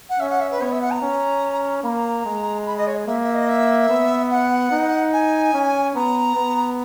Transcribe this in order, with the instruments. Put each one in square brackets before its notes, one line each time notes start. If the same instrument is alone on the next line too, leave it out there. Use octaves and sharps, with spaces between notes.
[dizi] F#5
[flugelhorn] C#4 [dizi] E5
[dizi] F#5
E5
B4
[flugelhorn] B3 [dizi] C#5
[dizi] E5
F#5
A#5
[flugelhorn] C#4
[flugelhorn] A#3 [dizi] B5
[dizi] A#5
[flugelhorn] G#3
[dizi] B5
D#5
C#5
[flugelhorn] A#3 [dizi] E5
[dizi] E5
D#5
E5
[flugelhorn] B3
[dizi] F#5
[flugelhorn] D#4
[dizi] G#5
[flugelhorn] C#4
[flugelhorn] B3 [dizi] A#5
[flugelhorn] B3